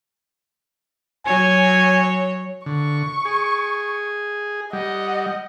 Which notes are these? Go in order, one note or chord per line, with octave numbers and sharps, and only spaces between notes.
F#3 C#5 G#5
D3 C#6
G#4
G3 D#5 F#5